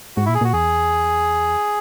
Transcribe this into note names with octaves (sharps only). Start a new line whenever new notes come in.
G#2 F#4
A#2 E4
G#4
A#2 F#4
E2 G#4